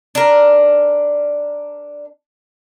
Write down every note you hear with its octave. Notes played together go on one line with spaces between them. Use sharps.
D4 A#4